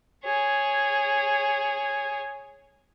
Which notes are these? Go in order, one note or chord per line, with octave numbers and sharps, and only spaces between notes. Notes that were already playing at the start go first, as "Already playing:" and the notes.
G#4 C#5